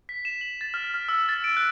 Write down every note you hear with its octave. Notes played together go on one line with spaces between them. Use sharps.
B6
E7
F#7
A6
F6
F6
E6
A6
D7
F#6